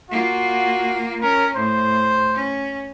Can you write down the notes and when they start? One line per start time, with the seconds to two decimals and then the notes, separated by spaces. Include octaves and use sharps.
0.11 A#3 F4 F#4
1.22 C#4 A#4
1.56 A2 C5
2.35 C#4